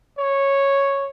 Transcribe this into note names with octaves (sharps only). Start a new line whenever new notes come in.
C#5